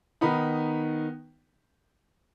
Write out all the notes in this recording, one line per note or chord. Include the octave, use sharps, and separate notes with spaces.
D#3 B3 D#4 B5